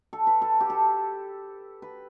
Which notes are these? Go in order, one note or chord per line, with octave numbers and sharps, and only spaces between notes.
A4
B4
A4
G4
A4
B4